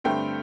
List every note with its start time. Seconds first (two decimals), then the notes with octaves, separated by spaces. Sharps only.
0.04 G2 D3 A3 C4 G5